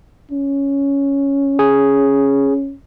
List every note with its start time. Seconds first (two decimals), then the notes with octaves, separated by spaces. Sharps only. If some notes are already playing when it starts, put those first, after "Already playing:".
0.31 C#4
1.59 G#4